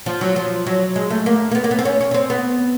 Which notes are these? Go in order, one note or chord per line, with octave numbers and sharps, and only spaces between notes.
F3
F#3
F3
F#3
G#3
A3
A#3
A#3
B3
A#3
B3
C4
C#4
C#4
C#4
C4
B3